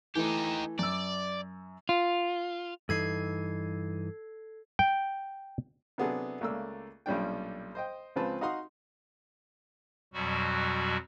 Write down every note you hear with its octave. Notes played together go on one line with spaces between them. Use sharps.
E3 A3 D#4 G4
F#2 D5 E6
F4
G2 E3 D#4 A4 G#6 C7
G5
C3 F#3 B3 D4 G#4 A4
C#2 A3 A#3 D5 E6
B1 A#2 G3 C#4 D4 G5
C5 D#5 G5
C#2 C#3 F3 C4 B4 A5
D#4 F#4 F5 F#5 C6 D#6
F2 B2 F#3 G3 F#4